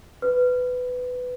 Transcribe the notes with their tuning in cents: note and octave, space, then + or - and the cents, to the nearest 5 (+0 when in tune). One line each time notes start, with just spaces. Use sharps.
B4 +15